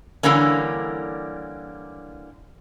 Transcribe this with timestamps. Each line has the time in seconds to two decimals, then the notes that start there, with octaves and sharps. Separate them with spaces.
0.23 D3 E3 G3 A#3 C#4